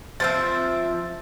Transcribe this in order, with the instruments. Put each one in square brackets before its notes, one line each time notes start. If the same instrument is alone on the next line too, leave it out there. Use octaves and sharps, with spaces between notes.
[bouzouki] F3 C4 E5 [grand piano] A6